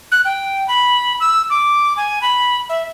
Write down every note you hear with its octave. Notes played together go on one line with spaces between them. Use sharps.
F#6
G5
B5
E6
D6
G#5
B5
E5